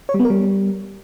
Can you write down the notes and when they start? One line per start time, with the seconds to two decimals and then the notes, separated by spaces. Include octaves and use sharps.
0.09 C#5
0.14 G3
0.19 B3
0.25 A#4
0.30 G3